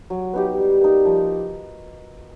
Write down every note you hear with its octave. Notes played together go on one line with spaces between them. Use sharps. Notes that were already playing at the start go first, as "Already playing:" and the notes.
F#3
B3 D#4 G4
G3
A#3 D#4
F3